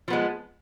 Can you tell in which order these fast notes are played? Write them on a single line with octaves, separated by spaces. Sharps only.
F3 B3 G#3